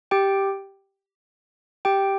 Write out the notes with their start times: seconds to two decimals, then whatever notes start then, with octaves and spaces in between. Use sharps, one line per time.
0.11 G4 G5
1.85 G4 G5